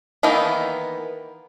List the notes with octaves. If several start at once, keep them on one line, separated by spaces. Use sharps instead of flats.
D#3 E3 A#3 B3 D#4